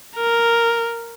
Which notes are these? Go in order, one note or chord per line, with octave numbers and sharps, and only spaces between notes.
A#4